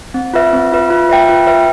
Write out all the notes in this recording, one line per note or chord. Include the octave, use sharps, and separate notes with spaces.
C4
F4 B4 E5
C4
F4 B4 E5
F4
B4 E5 G5
F4
B4 E5 G5